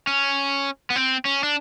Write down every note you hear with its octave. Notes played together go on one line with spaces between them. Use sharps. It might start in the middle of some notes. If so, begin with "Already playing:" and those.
C#4
B3
C4
C#4
D4